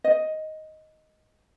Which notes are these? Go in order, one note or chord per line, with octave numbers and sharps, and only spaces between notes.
D#5